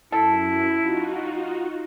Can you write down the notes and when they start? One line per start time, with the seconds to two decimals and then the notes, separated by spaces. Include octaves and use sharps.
0.12 F#2 E4 A4
0.77 D#4 F4 F#4